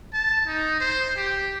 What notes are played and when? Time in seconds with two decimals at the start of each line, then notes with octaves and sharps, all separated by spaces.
0.13 A5
0.47 D#4
0.80 C5
1.17 G4